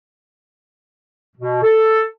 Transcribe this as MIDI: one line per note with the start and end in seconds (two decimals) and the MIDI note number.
1.36 1.59 47
1.62 2.04 69